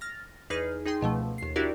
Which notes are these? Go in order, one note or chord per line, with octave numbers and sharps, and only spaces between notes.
F6 A6 A#6
E2 D#4 G#4 B4 F6
D#4 G#4 G5 C6
C#2 B2 F3 A3
D#2 C7
D4 E4 F#4 G4 A#4 D5